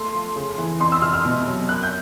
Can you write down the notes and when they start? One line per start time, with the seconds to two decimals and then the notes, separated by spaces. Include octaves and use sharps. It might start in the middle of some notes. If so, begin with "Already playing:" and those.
Already playing: A3 C6
0.15 F3
0.36 C#3
0.58 E3
0.80 F2 C6
0.92 E6
1.02 C3 F6
1.13 F6
1.25 B2
1.47 F#3
1.69 F#2 F#6
1.83 G6